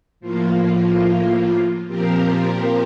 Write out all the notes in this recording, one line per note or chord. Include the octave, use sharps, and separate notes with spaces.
A2 F3 A#3 F4
A#2 F3 C4 G4 A#4